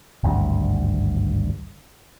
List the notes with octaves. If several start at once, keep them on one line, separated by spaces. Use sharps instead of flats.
G#1 D2 G2